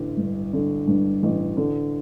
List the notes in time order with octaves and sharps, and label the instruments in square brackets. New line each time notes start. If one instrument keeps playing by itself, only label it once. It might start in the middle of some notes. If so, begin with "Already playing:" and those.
Already playing: [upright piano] A1 D3
G2
D3
G2
A1
D3